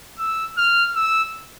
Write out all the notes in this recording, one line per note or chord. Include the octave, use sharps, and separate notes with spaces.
E6
F6
E6